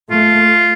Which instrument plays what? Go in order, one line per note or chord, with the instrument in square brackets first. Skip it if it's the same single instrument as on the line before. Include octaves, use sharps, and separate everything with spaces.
[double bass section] A3 [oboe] F4